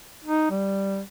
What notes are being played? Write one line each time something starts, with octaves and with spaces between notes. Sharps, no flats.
D#4
G3